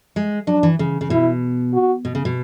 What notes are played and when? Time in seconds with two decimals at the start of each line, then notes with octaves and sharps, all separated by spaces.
0.16 G#3
0.47 F#3 D4
0.63 E3
0.79 C#3
1.01 C#3
1.10 B2 E4
1.73 F#4
2.05 B2
2.15 C#3
2.25 B2